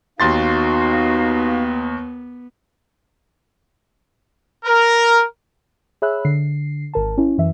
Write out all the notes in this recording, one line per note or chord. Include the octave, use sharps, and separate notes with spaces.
D#2 B3 D#4 F#4 F5 C6 A6
A#4
G#4 C#5 E5 B5 E6 F#6
D3 C7
G#1 A#4 A5
C#4 E4
F#2 E3 E5